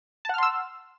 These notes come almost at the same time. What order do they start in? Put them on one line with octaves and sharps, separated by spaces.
A5 F#5 F6 C6 E6